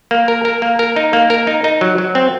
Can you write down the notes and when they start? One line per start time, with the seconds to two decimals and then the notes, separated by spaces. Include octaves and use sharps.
0.11 A#3
0.28 A#4
0.45 A#4
0.62 A#3
0.79 A#4
0.96 D#4
1.13 A#3
1.30 A#4
1.47 D#4
1.64 D#4
1.81 F#3
1.98 F#3
2.15 C4